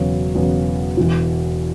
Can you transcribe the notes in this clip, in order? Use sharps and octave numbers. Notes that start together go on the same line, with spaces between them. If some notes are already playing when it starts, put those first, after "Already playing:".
Already playing: E1 E2 C#3 F#3 B3
E1 E2 C#3 F#3 B3
E1 E2 E3